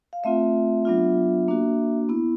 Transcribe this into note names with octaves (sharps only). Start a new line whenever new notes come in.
F5
A3 C4 F4 E5
F#3 B3 D4 F4
A#3 D4 F#4
B3 E4